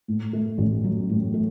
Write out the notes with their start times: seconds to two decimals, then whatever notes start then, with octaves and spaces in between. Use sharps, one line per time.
0.08 A2
0.33 A3
0.58 A1
0.84 F#3
1.09 A2
1.34 A3